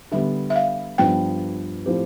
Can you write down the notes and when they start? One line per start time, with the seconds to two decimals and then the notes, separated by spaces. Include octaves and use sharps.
0.11 D3 G3 B3 E5
0.50 E5
0.56 F5
0.98 G2 F3 B3 D4 G5
1.86 A2 F3 C4 G4